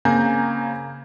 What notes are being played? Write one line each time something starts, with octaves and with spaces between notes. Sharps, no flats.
C#3 A#3 C4 G#5 A#5 G6